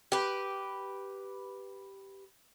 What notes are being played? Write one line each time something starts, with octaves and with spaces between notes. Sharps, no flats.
G4 B4